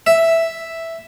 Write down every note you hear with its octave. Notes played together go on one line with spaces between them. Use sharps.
E5